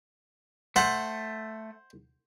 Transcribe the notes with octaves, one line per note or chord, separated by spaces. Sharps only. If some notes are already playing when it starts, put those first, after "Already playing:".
A3 C5 F#5